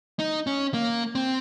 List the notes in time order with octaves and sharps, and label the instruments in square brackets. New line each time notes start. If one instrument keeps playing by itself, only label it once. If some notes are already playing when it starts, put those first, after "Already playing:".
[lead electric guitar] D#4
C#4
A#3
C4